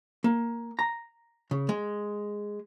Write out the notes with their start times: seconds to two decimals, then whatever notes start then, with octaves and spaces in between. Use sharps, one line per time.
0.24 A#3
0.79 A#5
1.51 C#3
1.69 G#3